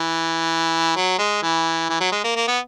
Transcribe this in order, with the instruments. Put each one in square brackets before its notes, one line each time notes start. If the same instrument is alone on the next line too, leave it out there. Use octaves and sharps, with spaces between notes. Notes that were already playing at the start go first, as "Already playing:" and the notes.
Already playing: [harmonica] E3
F#3
G#3
E3
E3
F#3
G#3
A#3
A#3
B3